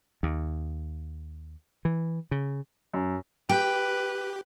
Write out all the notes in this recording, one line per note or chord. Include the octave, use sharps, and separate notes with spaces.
D#2
E3
C#3
F#2
G4 B4 G5